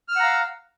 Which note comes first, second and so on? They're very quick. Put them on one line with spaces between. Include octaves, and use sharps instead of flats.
F6 E6 F#5 A#5 F5